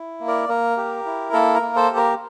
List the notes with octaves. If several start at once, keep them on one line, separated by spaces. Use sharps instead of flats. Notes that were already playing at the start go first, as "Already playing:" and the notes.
Already playing: E4
A#3
A#4 D5
A#3 A#4
G4
E4
A#3 A4
A#4
A#3
A4 C5
G4
A#4